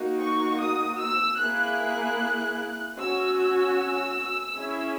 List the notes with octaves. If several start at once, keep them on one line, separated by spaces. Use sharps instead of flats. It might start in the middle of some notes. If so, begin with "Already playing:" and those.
Already playing: A#3 D#4 F#4
C#6
D#6
E6
A#3 E4 G#4 F#6
C#4 F#4 E6
E6
C#4 E4 G#4